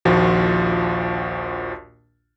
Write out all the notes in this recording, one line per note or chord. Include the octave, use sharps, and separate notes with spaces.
A#1 D#2 F3 F4 F#4